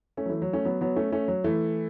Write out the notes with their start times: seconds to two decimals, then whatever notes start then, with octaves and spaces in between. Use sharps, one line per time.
0.17 A3 C#4
0.26 F#3
0.29 E3 A3
0.42 F#3
0.53 A3 C#4
0.65 F#3 B3
0.81 F#3 B3
0.96 A3 C#4
1.12 A3 C#4
1.28 F#3
1.44 E3 A3